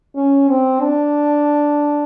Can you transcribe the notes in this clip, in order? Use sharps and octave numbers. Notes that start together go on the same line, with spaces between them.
C#4
C4
D4